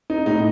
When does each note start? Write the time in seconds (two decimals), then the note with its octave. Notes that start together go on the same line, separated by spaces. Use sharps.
0.10 D#4
0.26 A2 D#4